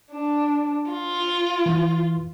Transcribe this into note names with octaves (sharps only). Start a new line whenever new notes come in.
D4
F4
E3